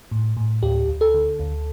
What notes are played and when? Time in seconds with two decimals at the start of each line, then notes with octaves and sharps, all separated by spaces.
0.11 A2
0.37 A2
0.63 D2 G4
0.88 D2
1.01 A4
1.14 D3
1.39 D2